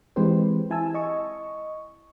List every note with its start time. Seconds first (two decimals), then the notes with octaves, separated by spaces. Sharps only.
0.16 E3 G#3 C4 G4 B4 C5
0.70 E4 G#5 A5 E6
0.94 D#5 C#6